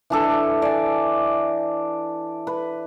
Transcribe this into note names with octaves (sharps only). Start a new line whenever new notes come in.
E3 D4 A4
D5 G#5
B4